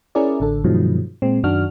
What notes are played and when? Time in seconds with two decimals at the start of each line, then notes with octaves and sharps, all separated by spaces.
0.15 C#4 E4 G#4 A#4 D5
0.40 A1 D3 A4
0.64 G2 B2 D#3 F3 F#3 G#3
1.22 A#2 G#3 C4
1.43 F#2 D#3 D4 F#4 F6